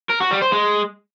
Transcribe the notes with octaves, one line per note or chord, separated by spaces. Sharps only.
A#4
F#4
G3
C5
G#3